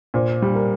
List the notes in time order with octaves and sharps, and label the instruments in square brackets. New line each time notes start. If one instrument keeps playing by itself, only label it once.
[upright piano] A#2 [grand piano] C5
[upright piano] G3
[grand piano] A#4